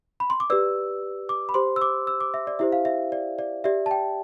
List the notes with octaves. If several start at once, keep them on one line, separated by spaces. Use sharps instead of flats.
B5
C6
D6
G4 B4 D5 E6
D6
B5
G4 C5 C6
E6
D6
E6
D6
E5
D5
E4 G4 C5 E5
F5
E5
D5
D5
G4 D5 E5
A5
G5